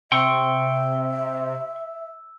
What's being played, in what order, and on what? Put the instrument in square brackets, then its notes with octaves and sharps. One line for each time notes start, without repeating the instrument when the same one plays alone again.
[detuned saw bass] C3 [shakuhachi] E5 [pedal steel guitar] G5 C6 C#6 [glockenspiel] E6